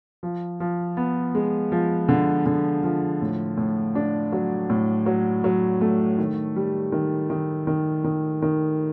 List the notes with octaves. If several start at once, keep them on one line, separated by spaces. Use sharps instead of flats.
F3
F3
B3
G#3
F3
D3
D3
F3
A2
A2
D4
F#3
A2
F#3
F#3
A3
D#3
G3
D#3
D#3
D#3
D#3
D#3